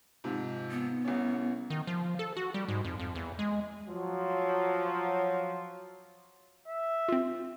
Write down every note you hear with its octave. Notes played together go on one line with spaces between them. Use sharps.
G#2 C3 F3
B3
C2 C#4
D#3
F3
A4
F#4
G3
G#2
F2
F2
E2
G#3
F3 F#3
E5
C4 F4